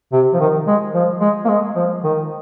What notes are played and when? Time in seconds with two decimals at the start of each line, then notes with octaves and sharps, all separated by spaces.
0.12 C3
0.33 F3
0.40 D#3
0.67 G#3
0.94 F3
1.21 G#3
1.45 A#3
1.49 G#3
1.76 F3
2.04 D#3